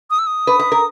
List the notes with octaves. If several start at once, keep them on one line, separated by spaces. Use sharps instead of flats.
D#6
E6
D#6
B4
B4
A#4